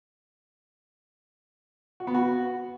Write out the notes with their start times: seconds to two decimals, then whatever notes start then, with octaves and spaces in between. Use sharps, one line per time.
2.00 F#4
2.07 B3
2.14 F#4